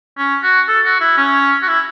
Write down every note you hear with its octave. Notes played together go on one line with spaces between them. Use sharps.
C#4
F#4
A4
F#4
E4
C#4
F#4
E4